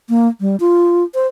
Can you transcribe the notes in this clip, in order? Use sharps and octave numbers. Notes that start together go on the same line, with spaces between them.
A#3
G3
F4
C5